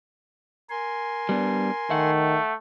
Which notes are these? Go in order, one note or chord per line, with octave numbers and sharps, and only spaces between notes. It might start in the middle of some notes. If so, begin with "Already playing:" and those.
A#4 G#5 C6
G3 B3 D4
D#3 A3 E5 F#5